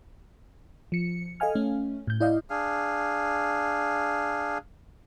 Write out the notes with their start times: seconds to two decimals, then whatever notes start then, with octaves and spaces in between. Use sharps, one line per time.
0.92 F3 C#7
1.40 A4 D#5 F5 G#5 F6
1.55 A3 C#4
2.07 A2 G6
2.20 E4 D5 D#5 F5
2.50 D4 G#4 F5